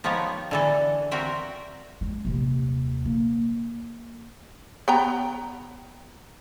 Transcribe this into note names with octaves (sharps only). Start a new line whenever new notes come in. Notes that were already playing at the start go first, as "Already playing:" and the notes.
F3 B3 D#4 G4 C#5
D3 E3 A4
C4 F#4 A#4 E5 G5
G#3
D#1 C3
A#3
B3 G5 A#5